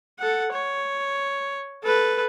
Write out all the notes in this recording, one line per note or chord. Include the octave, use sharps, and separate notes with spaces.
A4 F#5
C#5
A4 B4